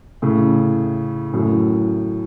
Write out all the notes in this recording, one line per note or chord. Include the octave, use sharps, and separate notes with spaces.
A2 C#3
F#2 A2